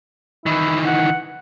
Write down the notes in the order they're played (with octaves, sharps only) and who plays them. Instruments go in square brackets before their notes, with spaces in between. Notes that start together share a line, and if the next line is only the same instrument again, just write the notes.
[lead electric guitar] D#3 E3 [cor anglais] E4
[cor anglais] F#5